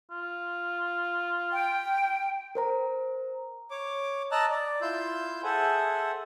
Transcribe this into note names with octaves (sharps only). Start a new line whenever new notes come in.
F4
G5
A#4 C5 A#5
C#5 D6
D#5 A5 A#5 E6 F#6
D5
E4 F4 C6 E6 G6
G#4 A4 C5 E5 F#5 G#5